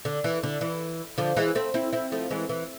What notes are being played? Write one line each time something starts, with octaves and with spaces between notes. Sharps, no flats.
D3
E3
D3
E3
D3 F3
E3 G#3
A3 C4
C4 E4
C4 E4
F3 A3
E3 G#3
E3